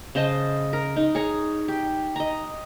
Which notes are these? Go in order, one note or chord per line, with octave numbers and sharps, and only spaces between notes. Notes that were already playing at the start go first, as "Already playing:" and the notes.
C#3 C5 D#5 A5
A#4
D#4
G#4 C#5 A#5
G4
D#5 A#5